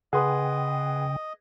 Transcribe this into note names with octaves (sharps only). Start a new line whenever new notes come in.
C#3 G#4 B4 D#5 F#5 G5 C6 D#6